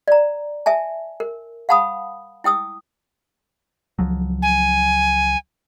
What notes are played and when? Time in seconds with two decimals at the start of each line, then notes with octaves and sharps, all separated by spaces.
0.08 D5 A#5
0.66 E5 G#5 A5
1.20 A#4
1.69 F5 F#5 A5 B5 D#6
2.44 E4 G5 D#6 E6
3.99 C#2 F3 F#3
4.42 G#5